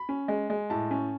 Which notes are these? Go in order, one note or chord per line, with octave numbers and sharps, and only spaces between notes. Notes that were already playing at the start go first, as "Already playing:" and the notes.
Already playing: B5
C#4
G#3
G#3
A2 A5
C#4